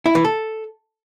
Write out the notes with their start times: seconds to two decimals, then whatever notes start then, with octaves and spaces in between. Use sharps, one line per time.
0.06 E4
0.15 E3
0.24 A4